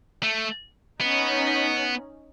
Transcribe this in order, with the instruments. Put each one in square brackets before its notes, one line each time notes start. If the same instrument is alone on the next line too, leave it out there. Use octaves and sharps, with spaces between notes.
[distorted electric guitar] A3
[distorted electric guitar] B3 [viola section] C#4 D#4